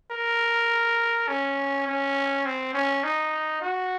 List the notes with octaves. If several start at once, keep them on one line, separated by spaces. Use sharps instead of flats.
A#4
C#4
C#4
C4
C#4
D#4
F#4